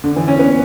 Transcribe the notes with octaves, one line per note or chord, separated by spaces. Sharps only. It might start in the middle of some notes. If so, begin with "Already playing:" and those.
D3
E3
C#4
B3